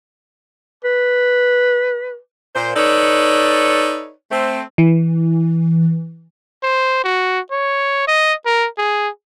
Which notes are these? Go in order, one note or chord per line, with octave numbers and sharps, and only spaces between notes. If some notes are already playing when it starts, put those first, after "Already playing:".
B4
A#2 C5
D#4 A4 B4 C#5 D5
A3 C4
E3
C5
F#4
C#5
D#5
A#4
G#4